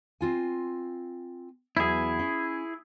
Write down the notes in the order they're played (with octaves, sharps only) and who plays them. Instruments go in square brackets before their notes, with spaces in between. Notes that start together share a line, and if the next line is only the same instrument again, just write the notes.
[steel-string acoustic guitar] C4 F4 G#5
[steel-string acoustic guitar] E2 F#3 B3 [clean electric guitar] E4 G#4
[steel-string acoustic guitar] C#4